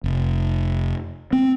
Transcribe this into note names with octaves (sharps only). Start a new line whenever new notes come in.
F1
C4